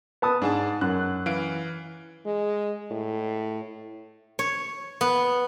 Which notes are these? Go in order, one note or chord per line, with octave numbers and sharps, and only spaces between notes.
B3 A5 D#6
G#2 D4 G#4 A5
F#2 F#6
E3 F5 D7
G#3
A2
C#5
B3